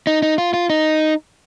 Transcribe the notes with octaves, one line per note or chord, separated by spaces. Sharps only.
D#4
D#4
F4
F4
D#4